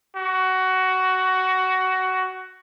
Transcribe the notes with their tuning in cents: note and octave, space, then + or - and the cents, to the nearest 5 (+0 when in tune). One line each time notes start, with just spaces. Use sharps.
F#4 +15